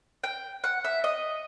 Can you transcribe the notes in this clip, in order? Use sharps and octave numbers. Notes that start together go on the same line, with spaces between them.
G5
F#5
E5
D#5